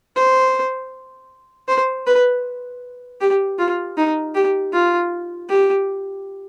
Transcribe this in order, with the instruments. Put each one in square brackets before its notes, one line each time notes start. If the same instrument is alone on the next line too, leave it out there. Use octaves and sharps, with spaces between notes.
[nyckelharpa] C5
C5
B4
G4
F4
D#4
G4
F4
G4